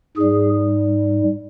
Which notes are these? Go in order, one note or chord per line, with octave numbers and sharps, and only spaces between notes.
G#2 G3 G#4